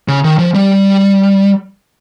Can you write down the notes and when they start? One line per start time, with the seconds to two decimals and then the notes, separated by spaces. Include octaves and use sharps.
0.08 C#3
0.24 D#3
0.39 F3
0.54 G3